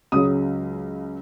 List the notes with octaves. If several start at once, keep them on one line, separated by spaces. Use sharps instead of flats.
C#2 C#3 F#3 D#6